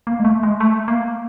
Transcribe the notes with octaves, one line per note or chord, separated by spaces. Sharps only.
A#3
G#3
A3
G#3
A3
A#3